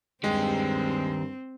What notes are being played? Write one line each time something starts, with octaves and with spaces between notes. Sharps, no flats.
G2 D#3 G#3 C4 G4